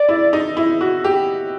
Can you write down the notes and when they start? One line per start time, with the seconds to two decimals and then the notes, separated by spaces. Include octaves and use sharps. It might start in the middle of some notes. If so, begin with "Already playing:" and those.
Already playing: D5
0.09 E4
0.33 D#4
0.57 E4
0.81 F#4
1.04 G4